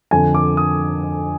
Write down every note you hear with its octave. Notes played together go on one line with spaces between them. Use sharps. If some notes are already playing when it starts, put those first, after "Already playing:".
F2 D3 G#5
D6
D#6